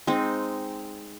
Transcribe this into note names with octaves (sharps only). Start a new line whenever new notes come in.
G#3 C4 D#4